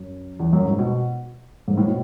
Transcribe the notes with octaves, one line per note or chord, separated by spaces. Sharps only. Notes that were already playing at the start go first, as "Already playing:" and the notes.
Already playing: F#2
E2
F#2
G#2
B2
G#2
A2
B2